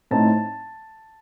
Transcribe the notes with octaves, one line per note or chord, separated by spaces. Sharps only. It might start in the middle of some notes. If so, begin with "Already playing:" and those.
A2 A3 C4 D#4 A5